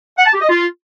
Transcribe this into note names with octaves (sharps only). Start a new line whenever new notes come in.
F#5
A5
G4
D#5
F4